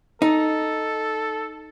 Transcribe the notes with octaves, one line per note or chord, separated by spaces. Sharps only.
D#4 A4